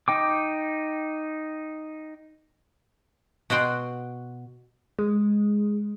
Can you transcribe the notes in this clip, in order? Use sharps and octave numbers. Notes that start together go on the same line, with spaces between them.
D#4 G5 D6
B2 F#4 F#5 G5 C6
G#3